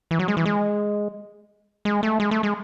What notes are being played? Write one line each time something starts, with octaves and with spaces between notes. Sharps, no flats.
E3
F#3
G#3
E3
G#3
G#3
A3
G#3
A3
G#3